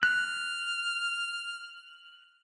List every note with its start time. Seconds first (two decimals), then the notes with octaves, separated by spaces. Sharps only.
0.03 F6 F#6